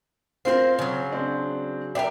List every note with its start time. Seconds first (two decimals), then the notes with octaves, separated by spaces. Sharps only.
0.45 C4 F4 A#4 C5
0.79 C#3 F#3
1.12 C4 D4
1.95 D4 A#4 E5 G5